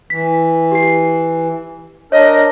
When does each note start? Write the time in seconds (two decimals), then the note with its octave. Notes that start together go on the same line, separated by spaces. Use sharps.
0.10 E3 B6
0.72 G4 C7
2.12 D4 A#4 C#5 D#5